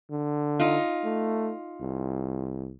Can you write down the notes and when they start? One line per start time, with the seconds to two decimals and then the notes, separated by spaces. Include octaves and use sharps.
0.10 D3
0.60 D#4 F4
1.04 A3
1.81 C2